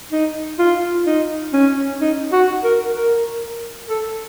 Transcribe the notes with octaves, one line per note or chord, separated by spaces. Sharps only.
D#4
F4
D#4
C#4
D#4
F#4
A#4
A#4
A4